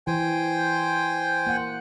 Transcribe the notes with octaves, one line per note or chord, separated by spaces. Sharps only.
E3 C5 G5 G#5
A#3 F#5